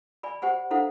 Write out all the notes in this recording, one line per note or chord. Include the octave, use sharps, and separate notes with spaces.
D5 G#5 B5
G4 C5 F#5 G#5
D4 E4 A4 C5 F5 F#5